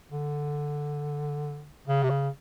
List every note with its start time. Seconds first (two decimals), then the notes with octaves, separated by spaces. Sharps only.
0.11 D3
1.88 C#3
2.03 C3
2.10 C#3